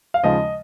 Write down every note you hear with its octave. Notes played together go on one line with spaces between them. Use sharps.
F5
D#2 C#3 F3 G#3 D#5